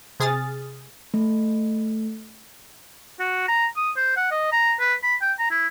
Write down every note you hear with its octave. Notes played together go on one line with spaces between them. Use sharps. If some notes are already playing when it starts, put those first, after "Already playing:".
C3 G#4 D#6 F6 A6
A3
F#4
A#5
D#6
C5
F#5
D#5
A#5
B4
B5
G5
A#5
E4